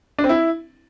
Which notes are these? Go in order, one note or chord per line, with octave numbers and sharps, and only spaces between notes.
D4
C4
E4